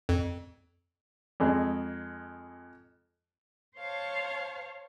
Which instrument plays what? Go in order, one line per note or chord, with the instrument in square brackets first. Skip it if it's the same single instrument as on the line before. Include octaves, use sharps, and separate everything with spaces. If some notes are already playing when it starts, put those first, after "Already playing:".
[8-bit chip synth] F2
[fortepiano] F2 G#3
[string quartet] C5 C#5 F5 A5